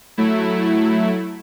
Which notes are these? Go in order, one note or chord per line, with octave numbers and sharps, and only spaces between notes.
F#3 A3 E4